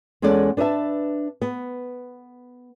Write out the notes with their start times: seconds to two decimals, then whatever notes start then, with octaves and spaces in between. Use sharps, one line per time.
0.22 E2 G#3 C#4 A4 D5 F#5
0.57 D4 B4 D5 E5 A5
1.42 B3